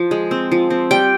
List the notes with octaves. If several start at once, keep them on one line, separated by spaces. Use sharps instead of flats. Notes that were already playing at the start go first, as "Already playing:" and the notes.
Already playing: F3
G#3
C4
F3
C4
G3 G5